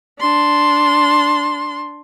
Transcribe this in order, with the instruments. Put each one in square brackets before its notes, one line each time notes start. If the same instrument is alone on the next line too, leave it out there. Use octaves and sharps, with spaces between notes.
[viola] D4 C6